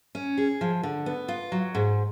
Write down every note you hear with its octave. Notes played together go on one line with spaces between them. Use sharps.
C#4
G#4
F3
D3
B3
F4
F#3
G#2